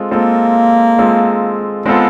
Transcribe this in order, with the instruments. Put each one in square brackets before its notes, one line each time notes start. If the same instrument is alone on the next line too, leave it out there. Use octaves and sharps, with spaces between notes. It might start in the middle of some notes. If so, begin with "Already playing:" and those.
Already playing: [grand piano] G#3 C4 F4 A4
[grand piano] G#3 C4 F4 A4 [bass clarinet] A#3
[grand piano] G#3 C4 F4 A4
[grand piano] G#3 C4 F4 A4 [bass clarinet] B3